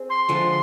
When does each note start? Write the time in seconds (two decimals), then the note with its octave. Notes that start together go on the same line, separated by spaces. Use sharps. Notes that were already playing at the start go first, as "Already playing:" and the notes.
Already playing: C4 G#4
0.09 C6
0.29 D3 F3 G#3